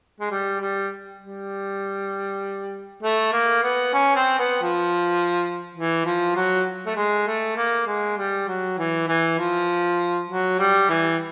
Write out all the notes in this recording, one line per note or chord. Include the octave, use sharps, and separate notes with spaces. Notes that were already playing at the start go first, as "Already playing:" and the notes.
G#3
G3
G3
G3
A3
A#3
B3
C#4
C4
B3
F3
E3
F3
F#3
A3
G#3
A3
A#3
G#3
G3
F#3
E3
E3
F3
F#3
G3
E3